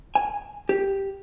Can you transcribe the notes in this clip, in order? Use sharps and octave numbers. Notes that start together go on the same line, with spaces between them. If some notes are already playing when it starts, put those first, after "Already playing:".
G#5
G4